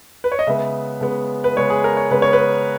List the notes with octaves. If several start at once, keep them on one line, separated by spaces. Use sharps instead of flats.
B4
C#5
D#5
C#3 G#3 B3 E5
C#3 G#3 B3
B4
C#3 G#3 B3 C#5
G#4
A#4
C#5
C#3 G#3 B3 B4
C#5
B4